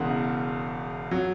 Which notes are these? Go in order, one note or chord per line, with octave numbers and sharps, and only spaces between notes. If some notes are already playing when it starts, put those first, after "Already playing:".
Already playing: E1 E2 C#3 F#5
F#3